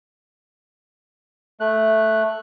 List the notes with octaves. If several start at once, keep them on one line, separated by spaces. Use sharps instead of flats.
A3 F#6